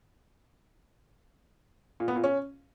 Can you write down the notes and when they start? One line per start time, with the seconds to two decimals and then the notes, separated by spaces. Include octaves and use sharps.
2.00 A#2
2.08 B3
2.16 A#2
2.24 C#4